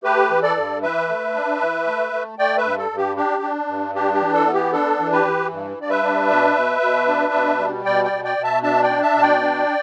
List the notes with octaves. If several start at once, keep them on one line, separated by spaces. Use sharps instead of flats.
A3 G4 B4
E3
A4 D5
G2
E3 B4 E5
A3
D4
E3
A3
A3
A3 D5 G5
B4 E5
G2
A4
G2
G4
D4 G4
D4
G2
D4 G4
G4
E3
A4
B3
G4
D4 A4
E3
G4 B4
E3
G2
G2 D5
B4 E5
D4
B2
B2
B2
D4
B2
G3
B2 D5 G5
D5 G5
B2
D5 G5
B2
E5 A5
D4 E5 A5
D5 G5
D4
E5 A5
B2 A5
D5 G5
D4